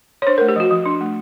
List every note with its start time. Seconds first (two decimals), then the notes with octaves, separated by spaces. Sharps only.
0.22 C#5
0.27 D4 C5
0.38 A#4
0.41 A3
0.48 G4
0.56 F3 F#4
0.71 F3
0.86 D4
1.01 A3